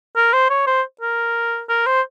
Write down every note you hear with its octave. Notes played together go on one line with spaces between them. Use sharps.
A#4
C5
C#5
C5
A#4
A#4
C5